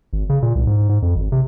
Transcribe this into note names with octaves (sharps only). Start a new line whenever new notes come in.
G#1
C#3
A#2
C2
G#2
G#2
F2
G#1
C3